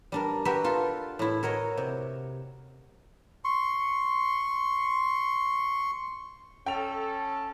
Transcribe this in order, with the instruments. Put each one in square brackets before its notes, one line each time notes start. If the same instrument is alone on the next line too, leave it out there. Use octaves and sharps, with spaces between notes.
[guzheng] G3 D4 A#4
F#4 G4 A#4 B4 E5
F4 A4
A2 E4
F#4 A#4 C#5 D#5
C3
[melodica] C6 C#6
[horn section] C#4 A4 [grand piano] G5 F7